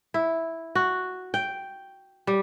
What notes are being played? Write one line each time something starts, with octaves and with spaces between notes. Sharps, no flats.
E4
F#4
G5
G3